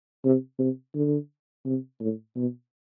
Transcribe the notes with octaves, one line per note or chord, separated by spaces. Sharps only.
C3
C3
D3
C3
A2
B2